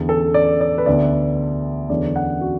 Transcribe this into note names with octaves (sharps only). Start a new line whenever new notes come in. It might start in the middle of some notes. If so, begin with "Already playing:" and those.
Already playing: E2 D3 B3
A4
D5
D5
B4
D2 D3 B3 D5
E2 D3 F#3 B3 D5
F#5
F#4